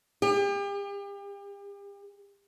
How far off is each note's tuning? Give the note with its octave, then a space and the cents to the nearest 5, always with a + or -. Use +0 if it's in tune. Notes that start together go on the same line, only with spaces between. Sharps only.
G4 +40